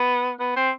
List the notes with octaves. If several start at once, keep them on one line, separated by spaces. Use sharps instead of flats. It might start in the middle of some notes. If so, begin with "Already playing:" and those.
Already playing: B3
B3
C4